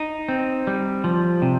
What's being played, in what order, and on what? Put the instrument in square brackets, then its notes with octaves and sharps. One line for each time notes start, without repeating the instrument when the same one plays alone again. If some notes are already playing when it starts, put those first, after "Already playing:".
Already playing: [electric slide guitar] D#4
C4
G3
F3
C3